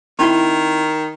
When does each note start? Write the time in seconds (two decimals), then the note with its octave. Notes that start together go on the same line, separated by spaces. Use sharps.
0.19 D#3 C4 E4 C6